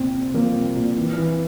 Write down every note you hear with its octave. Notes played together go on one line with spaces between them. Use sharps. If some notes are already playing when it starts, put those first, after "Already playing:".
Already playing: C2 A#2 C4
C2
F3 A#3
C2
A#2
E3
E3